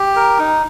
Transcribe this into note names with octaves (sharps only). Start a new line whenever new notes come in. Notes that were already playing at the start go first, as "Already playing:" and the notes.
Already playing: G4
A#4
D#4